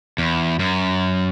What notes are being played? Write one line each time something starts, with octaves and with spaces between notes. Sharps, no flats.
E2
F#2